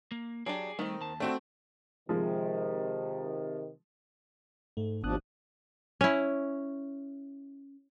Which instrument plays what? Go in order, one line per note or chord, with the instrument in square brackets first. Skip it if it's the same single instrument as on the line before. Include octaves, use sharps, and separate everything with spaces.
[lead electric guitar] A#3
[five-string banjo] F#3 D4 G4 [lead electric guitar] G#4 D5
[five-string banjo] D#3 C4 [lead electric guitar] G3 A3
[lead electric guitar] D#2 A5
[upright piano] A3 C4 F#4 [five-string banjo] D4
[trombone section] C3 D#3 [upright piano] F3 G#3
[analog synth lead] G#2 [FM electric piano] A3
[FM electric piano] G#1 D#6 F#6 [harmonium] D#2 F3 D4 [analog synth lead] B3
[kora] C#4 E4